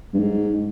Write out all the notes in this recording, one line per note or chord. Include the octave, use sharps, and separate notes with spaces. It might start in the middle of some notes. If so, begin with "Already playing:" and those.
G2
G#2